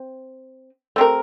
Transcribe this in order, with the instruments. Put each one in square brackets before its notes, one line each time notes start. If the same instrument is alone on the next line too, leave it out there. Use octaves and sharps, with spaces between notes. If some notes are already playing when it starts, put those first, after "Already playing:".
Already playing: [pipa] C4
A3 C4 G4 A#4